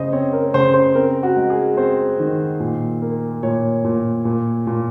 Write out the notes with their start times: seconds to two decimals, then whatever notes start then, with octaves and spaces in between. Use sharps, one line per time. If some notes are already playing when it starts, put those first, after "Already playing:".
Already playing: C#3 C5 D#5
0.13 C4 C#5
0.33 A#4
0.54 C#3 C5
0.74 C5
0.95 C4 A#4
1.23 F#4
1.36 G#3
1.50 G#4
1.77 C4 C5
2.20 D#3
2.60 A#2
3.02 A#3
3.43 A#2 C#5
3.84 A#2
4.25 A#2
4.67 A#2